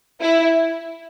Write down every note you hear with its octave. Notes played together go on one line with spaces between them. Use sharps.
E4